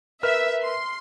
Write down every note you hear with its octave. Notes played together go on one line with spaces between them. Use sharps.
A#4 B4 E5 F6
C6